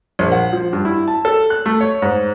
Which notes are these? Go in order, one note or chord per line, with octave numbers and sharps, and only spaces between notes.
A#1
F#5
F3
G2
E4
A5
A4
F#6
A3
C#5
G#2